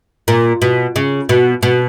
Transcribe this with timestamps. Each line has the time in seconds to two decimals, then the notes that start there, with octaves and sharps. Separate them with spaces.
0.28 A#2
0.62 B2
0.96 C#3
1.29 B2
1.63 B2